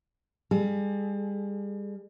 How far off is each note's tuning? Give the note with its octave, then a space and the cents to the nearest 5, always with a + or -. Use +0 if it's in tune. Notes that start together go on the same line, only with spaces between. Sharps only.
G3 +40 G#4 +40